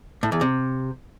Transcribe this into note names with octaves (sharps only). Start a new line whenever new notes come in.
A2
E2
C3